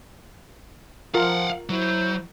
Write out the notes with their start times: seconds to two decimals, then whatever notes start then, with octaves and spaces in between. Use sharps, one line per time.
1.14 F3 F4 A#4 F5 F#5
1.69 F#3 E4 C5